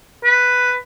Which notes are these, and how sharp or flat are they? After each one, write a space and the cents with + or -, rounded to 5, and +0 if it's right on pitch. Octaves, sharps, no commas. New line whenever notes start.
B4 +5